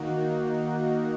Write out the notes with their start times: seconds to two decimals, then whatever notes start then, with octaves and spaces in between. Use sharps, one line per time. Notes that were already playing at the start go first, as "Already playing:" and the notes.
Already playing: D#3 A#3 D#4 F#4